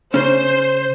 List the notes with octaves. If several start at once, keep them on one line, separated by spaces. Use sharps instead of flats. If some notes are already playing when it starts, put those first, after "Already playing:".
C#3 C#4 C5